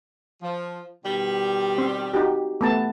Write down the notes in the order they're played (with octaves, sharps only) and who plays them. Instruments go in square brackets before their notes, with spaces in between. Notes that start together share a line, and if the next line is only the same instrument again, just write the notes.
[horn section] F3
B2 D#3 G3
[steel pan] C4
D#4 F#4 G4
A3 B3 A5